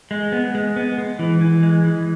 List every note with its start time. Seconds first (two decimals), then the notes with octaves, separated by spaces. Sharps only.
0.11 G#3
0.32 B3
0.55 G#3
0.76 B3
0.98 G#3
1.19 E3
1.41 E3
1.63 G#3
1.84 E3